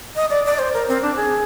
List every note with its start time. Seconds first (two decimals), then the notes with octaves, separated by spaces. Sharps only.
0.16 D#5
0.30 D5
0.45 D5
0.59 C5
0.74 A#4
0.88 C4
1.02 D4
1.16 G#4